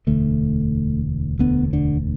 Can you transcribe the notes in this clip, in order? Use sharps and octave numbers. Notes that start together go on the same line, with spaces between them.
E1 D2 D3 A3
E1 D2 D3 B3
D3